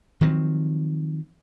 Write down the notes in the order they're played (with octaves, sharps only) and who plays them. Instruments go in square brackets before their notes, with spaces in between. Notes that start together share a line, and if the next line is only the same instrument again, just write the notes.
[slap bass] D#3 F3 F#3 C4